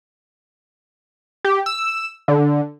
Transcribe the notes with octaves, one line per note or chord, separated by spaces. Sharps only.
G4
E6
D3